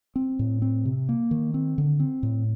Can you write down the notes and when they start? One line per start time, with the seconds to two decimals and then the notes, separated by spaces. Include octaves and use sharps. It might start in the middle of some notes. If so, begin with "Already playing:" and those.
0.16 C4
0.39 A2
0.62 C4
0.85 C3
1.09 A#3
1.31 D#3
1.54 C4
1.78 D3
2.00 C4
2.23 A2